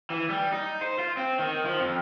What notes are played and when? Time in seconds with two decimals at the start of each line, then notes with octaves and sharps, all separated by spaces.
0.10 E3
0.30 G3
0.53 D#4
0.81 C5
0.99 F4
1.17 C4
1.39 D#3
1.66 F3
1.80 F2